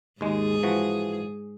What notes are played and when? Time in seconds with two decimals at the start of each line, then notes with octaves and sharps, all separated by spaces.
0.21 D#2 G#2 G#3 G#4
0.63 E3 F3 F#4